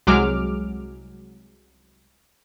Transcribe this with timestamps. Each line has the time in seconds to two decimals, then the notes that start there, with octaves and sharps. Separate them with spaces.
0.07 C2 F#3 G#3 D6 F6